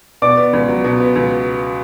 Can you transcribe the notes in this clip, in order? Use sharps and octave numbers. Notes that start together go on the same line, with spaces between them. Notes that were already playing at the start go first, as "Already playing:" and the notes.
B2 D5 D6
B3
C#2
F#3
B2
B3
C#2